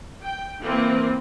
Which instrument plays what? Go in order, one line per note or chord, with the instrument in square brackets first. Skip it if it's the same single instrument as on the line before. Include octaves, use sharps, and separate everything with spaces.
[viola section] G5
E3 A#3 C4